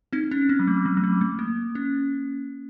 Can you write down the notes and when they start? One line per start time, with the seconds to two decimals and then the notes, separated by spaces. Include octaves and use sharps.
0.13 C4 D#4
0.31 C#4
0.49 C4
0.59 F#3
0.67 A3
0.86 F#3
0.97 F#3
1.04 A3
1.21 A3
1.39 A#3
1.75 C#4